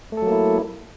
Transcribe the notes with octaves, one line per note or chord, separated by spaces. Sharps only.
F#3 A3 A#3 E4 A4